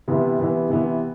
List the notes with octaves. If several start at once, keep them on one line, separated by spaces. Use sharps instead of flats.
C3 E3 B3
C3 E3 B3
C3 E3 B3